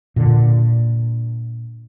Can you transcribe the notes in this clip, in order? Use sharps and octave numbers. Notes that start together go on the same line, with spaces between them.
A#2 D3